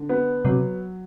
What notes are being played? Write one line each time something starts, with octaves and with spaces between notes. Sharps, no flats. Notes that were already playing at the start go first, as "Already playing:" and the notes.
Already playing: D3
B3
C3 F#3